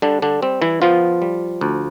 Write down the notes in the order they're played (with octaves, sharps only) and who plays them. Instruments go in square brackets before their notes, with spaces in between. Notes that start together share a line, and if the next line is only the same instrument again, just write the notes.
[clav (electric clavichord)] D3 G3 D4
D3 D4
G3 C4
E3 E4
F3 B3 F4
G3
D2